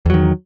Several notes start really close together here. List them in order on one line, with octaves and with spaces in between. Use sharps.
E2 F#3 D#3